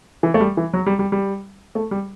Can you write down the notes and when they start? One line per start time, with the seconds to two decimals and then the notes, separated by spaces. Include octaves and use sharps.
0.23 E3
0.34 A3
0.40 G3
0.57 E3
0.74 F#3
0.86 G3
0.99 G3
1.12 G3
1.75 A3
1.91 G3